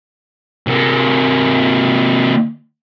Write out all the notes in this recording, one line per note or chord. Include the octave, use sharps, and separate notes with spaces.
C3 A#3